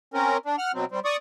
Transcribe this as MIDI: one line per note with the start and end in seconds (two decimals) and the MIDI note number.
0.14 0.37 60
0.14 0.37 61
0.14 0.37 70
0.46 0.56 62
0.58 0.72 78
0.58 0.72 89
0.74 0.85 47
0.74 0.85 54
0.74 0.85 60
0.91 1.00 55
0.91 1.00 60
1.05 1.17 74
1.05 1.17 85
1.05 1.17 87